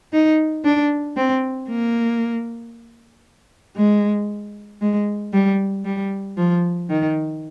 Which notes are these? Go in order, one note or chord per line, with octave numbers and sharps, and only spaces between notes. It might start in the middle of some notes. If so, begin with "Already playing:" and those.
D#4
D4
C4
A#3
G#3
G#3
G3
G3
F3
D#3